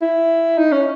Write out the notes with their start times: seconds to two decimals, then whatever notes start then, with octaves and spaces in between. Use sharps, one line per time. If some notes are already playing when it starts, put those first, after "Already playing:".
0.01 E4
0.58 D#4
0.72 C#4